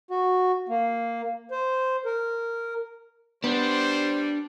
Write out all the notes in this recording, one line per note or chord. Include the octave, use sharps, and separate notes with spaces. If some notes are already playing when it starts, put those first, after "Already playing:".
F#4
A#3
C5
A#4
G3 B3 D4 C5